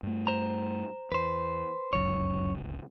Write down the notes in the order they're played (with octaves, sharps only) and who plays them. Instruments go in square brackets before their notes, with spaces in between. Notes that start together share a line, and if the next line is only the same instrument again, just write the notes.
[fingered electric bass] G2 A3
[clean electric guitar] C5 A#5
[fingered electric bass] E2 [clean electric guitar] B4 C5
[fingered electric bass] D1 G1 C#2 [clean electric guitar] F#2 C#5